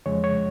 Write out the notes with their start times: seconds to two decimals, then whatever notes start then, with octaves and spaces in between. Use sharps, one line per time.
0.06 F2 C#3 F3 G#3 C#5
0.24 C#5